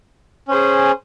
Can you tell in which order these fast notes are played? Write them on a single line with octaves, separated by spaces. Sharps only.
C#4 C5 G#4